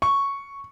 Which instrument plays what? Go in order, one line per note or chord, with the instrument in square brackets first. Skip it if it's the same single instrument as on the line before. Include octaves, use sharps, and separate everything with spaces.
[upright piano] C#6